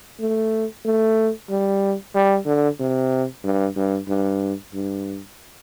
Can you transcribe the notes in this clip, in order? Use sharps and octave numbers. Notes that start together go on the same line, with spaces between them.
A3
A3
G3
G3
D3
C3
G2
G2
G2
G2